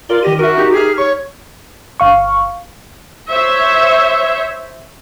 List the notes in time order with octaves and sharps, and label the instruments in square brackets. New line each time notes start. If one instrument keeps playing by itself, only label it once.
[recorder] F4 [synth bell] A#4 D5 G7
[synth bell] D#3 A#6 D#7 [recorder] G4
[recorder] F#4 [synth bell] A#4 E5
[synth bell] D#4 G4
[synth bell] G4 F6 [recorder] G#4
[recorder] C#5 [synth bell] C#6
[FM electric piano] G1 F5 C#6
[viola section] C5 C#5 E5